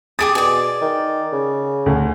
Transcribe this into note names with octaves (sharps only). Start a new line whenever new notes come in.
G4 G#4 D#6 A6 D7
B2 G#4 D5
D#3
C#3
D2 G#5